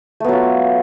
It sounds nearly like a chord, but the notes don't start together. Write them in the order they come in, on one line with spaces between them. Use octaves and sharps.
A3 B3 F#3 F4